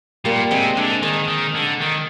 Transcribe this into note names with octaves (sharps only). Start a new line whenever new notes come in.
A#2 G3 A#3
C3 G#3 C4
D3 G#3
D#3 G#3
D#3
D3
D#3